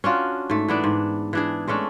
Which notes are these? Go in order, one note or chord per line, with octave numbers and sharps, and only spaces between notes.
C#4 D4 F4 F#4
G#2 A3
E3 B3 D4
G#2
E3 D4 G#4
G#3 A3 C#4 D4